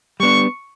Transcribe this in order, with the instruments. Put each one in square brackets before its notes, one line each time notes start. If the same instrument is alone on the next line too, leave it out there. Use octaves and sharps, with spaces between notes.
[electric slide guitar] G3 B3 D4 [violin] C#6